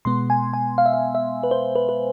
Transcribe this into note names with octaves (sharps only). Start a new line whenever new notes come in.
B2 G#3 B3 C6
G#5
G#5
F5
E5
F5
E5
B4
C5
B4
B4